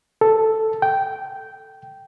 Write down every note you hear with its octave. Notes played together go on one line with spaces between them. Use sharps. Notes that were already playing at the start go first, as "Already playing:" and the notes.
A4
G5